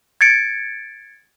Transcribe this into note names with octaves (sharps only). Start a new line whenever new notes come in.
G#6 A6 C#7 D7